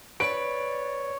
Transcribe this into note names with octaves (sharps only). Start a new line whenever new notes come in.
B4 C#5 D5 D7